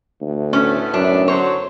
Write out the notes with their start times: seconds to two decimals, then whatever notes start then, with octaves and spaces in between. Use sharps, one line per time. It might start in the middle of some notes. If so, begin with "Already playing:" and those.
0.21 D2
0.53 A2 A3 B3 C#4
0.94 F#2 D4
1.28 D3 F#3 C5 C#5